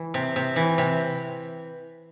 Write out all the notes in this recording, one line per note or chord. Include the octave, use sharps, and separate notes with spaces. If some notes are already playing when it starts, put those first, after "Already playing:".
Already playing: E3
C3
C3
E3
C3